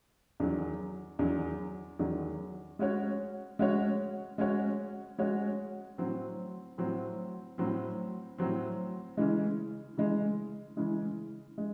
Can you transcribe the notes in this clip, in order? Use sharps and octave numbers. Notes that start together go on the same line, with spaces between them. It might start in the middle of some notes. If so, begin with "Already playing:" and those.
E2 D#3 F#3
E2 D#3 F#3
E2 D#3 F#3
G#3 C#4 F#4 C#5
G#3 C#4 F#4 C#5
G#3 C#4 F#4 C#5
G#3 C#4 F#4 C#5
A2 F#3 C4
A2 F#3 C4
A2 F#3 C4
A2 F#3 C4
C#3 E3 G#3
C#3 E3 G#3
C#3 E3 G#3
G#3